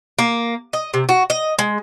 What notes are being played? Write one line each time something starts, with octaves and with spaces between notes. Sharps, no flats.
A#3
D#5
C3
F#4
D#5
G#3